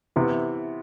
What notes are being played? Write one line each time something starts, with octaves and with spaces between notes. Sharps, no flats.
C3 E3 B3